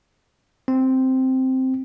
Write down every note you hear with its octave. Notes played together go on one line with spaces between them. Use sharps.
C4